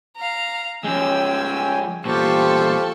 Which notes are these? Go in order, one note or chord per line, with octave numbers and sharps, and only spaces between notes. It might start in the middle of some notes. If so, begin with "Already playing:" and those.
F5 A#5
F3 G#3 C#4 G5 G#5 E6
E2 A#2 F4 G4 A4 C5 C#6